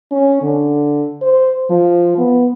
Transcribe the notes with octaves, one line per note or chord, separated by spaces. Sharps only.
C#4
D3
C5
F3
B3